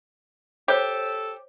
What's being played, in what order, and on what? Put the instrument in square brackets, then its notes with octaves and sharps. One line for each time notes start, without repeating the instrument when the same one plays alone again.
[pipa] G4 [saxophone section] A4 [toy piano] C5 C#5